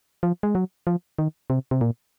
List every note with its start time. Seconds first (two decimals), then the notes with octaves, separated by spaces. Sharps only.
0.23 F3
0.43 G#3
0.55 F#3
0.87 F3
1.19 D#3
1.50 C3
1.71 C3
1.81 A#2